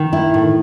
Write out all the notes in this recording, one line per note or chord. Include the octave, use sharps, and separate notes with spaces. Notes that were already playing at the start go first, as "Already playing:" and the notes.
Already playing: D#3
E4
A2